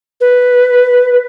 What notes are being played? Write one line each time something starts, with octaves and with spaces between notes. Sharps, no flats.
B4